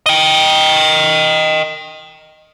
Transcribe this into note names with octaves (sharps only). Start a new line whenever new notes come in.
D#5 G5